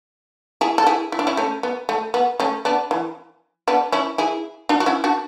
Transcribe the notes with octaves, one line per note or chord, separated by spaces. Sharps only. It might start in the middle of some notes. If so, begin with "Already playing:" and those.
E4 G#4
A4
E4 G#4
E4
D4
C#4 E4
A3 C#4
B3
A3
B3
A3 C#4
B3 D4
E3
B3 D4
C#4 E4
E4 G#4
D4 F#4
F#4
C#4 E4
D4 F#4